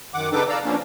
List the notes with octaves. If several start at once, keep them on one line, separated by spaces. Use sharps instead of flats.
F#2 D#3 F#5 D6
C#3 D4 D#4 A4 B4 D6
A4 D5 F5 A#5 E6
F3 A#3 B3 C#4 D4